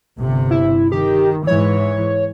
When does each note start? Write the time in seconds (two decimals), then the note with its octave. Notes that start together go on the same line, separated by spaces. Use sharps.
0.19 G1 C3
0.51 E4
0.92 D#3 G4
1.47 G#2 E3 C#5